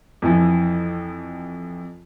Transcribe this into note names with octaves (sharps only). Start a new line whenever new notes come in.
F2 E3 F3